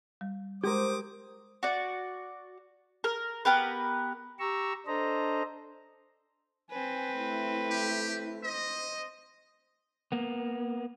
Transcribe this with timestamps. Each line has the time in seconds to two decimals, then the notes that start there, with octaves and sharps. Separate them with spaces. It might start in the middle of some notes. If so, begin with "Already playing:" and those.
0.21 G3
0.64 G#3 G4 A#4 C5 D6 D#6
1.63 F#4 D5
3.04 A#4
3.45 B3 G4 A#4 B4
4.39 G4 A#5 C#6 E6
4.87 D4 A4 C5 D#5 A#5
6.71 C4 B4 G#5
7.15 A3 E4
7.70 G4
8.43 C5 D#5
10.12 A#3 B3